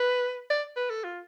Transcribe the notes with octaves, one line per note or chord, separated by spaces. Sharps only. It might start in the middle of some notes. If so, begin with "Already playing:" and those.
Already playing: B4
D5
B4
A4
F4